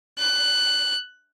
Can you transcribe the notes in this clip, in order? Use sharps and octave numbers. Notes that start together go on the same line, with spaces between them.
F#6